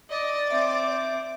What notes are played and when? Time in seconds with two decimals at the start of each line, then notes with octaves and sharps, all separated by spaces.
0.10 D5 D#5
0.50 C4 E5 D6